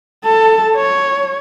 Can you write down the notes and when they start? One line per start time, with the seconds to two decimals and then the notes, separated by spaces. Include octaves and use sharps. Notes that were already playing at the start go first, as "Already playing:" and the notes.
0.25 A4 A5
0.76 C#5